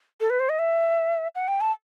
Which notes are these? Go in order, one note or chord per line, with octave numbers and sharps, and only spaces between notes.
A4
B4
C5
D#5
E5
F#5
G5
A5